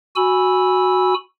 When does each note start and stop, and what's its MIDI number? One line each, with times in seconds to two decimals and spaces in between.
0.16 1.14 66
0.16 1.14 80
0.16 1.14 83
0.16 1.14 88